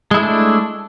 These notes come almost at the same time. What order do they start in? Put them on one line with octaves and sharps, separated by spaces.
G#3 E4 A3 D4